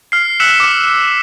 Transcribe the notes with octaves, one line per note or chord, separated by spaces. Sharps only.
F6 C7
E6 F#6 B6 C#7 E7
D6